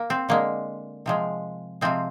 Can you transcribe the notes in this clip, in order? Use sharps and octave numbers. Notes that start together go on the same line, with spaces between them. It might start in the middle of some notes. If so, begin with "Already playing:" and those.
Already playing: A#3
C4
D3 G#3 A#3
C3 F3 G#3
C3 F3 G#3 C4